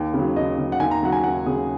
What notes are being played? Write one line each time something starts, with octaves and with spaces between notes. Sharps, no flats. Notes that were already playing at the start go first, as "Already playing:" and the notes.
Already playing: D#2
C#3
F#3
D#2 D#5
C#3 F#3
F#5
D#2 G#5
A#5
C#3 F#3 F#5
G#5
D#2 F#5
C#3 F#3 G#4